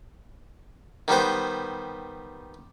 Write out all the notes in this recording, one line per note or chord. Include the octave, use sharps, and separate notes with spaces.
D#3 G3 B3 C5